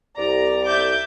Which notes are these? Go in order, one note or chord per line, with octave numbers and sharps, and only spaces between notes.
C2 D5 A#5
E5 D6 G6